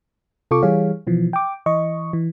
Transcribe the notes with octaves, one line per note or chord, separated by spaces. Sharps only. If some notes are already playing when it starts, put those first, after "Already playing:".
C3 F4 A4 C#6 D6
E3 G3 G#4 C#5 F5
B2 E3 F3
G5 D6
E3 D#5 C#6
E3